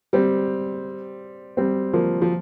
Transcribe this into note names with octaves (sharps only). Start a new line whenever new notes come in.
G3 C4
G3 C4
F3 A#3
F3